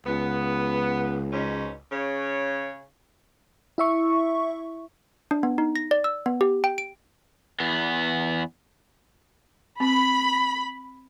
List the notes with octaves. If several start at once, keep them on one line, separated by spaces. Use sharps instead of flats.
C#2 B3
G#2 B2 C#4
C#3 C#5
E4 E5 C#6
D4
B3
D#4
A#6
D5
E6
B3
G4
G5
D7
E2 B3
C4 B5